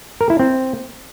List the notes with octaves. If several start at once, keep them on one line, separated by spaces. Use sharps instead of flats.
A#4
E4
C4